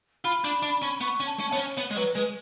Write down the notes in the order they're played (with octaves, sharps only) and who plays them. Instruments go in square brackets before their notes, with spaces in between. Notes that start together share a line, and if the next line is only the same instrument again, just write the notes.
[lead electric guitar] F4 [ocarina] B5
[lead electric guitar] D4
D4
C#4
[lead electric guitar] B3 [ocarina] C#6
[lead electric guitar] C#4
[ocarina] A5
[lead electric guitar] C#4
[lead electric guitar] B3 [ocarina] C#5
[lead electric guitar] C#4
B3
G#3
[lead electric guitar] F#3 [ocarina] B4
[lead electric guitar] G#3 [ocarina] B4